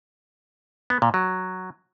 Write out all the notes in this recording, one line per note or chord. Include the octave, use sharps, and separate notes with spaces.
B3
A#2
F#3